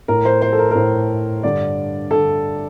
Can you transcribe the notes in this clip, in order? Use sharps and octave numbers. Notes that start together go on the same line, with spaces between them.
A2 A#4
C5
C5
A4
A#4
A#4
A2 C5
G2 D3 D5
D3 A4